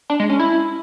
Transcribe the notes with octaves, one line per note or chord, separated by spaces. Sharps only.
D4
G#3
C#4
E4